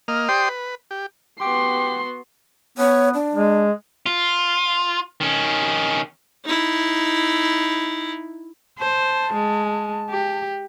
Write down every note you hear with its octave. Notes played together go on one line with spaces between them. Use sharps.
A#3 D#5 F6
G4 C5 D5 G5 C6 D#6
B4
G4
B3 F#4 G4 C6
B3 C#5
D4
G#3
F4
D#3 C#4
D#4 E4
C5 A5
G#3
G4